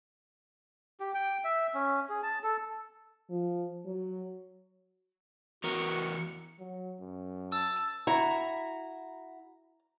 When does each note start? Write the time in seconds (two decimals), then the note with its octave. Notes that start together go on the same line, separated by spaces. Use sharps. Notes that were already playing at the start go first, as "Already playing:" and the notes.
1.00 G4
1.14 G5
1.44 E5
1.75 C#4
2.09 G#4
2.23 A5
2.43 A4
3.30 F3
3.85 F#3
5.64 E2 F#4 A#4 C#7
6.60 F#3
7.00 F#2
7.52 A5 E6
8.07 E4 F#4 A#5